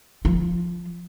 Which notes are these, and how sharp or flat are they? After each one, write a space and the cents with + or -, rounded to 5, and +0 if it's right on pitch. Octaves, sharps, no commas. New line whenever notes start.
F3 +0 F4 -30